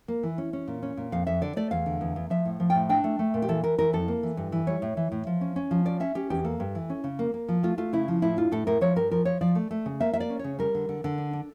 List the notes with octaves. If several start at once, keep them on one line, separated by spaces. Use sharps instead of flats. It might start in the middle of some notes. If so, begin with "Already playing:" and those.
A#3
E3
C#4
C#4
A#2
C#4
A#2
F2 F5
F2 E5
D3 D5
A3 D5
E2 F5
D3
E2
E2
F3 E5
A2
F3
A2 G5
D4 G5
A3
A3
A#2
G4
E3 A4
E3 A#4
E3 A#4
F2 A4
A#3
E3
G2
E3
G3 C#5
A2
E3
A2
F3
C#4
C#4
F3
C#4 D5
C#4 E5
C#4 G4
E2 G4
A#3 A4
G2
E3
C#4
C#3
A#3
A#3
F3
A3 F4
A3 F4
C#3 E4
F3
A2 E4
D4 F4
A2 A4
A2 A#4
F3 C#5
G2 A#4
F3 A#4
F3 C#5
F3 D5
A3
A3
C#3
A#3 E5
A#3 E5
D5
C#4
C#3 C#5
G3 A#4
D3
D3
D3
D4
D4